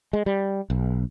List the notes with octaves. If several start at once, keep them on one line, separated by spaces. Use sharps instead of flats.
G#3
G3
B1